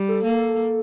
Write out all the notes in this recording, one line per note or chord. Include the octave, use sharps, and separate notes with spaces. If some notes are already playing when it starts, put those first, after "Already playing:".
Already playing: G3
A4
A#3